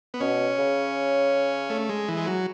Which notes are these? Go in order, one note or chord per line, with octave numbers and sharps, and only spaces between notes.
B3
B2 C#4
C#3
A3
G#3
E3
G#3
F#3